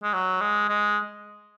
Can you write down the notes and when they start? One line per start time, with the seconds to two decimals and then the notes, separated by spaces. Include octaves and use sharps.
0.03 G#3
0.13 F#3
0.41 G#3
0.69 G#3